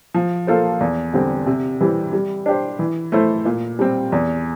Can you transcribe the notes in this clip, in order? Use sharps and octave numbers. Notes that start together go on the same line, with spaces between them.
F3
A#3 F4 A4 C5
E2
D3 G3 C4
C3
E3 G3 C4 G4
G3
D4 G4 C5
E3
A3 E4 A4 C5
A#2
G3 C4
E2